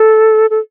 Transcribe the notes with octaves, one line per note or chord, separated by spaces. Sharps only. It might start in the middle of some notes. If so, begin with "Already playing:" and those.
Already playing: A4
A4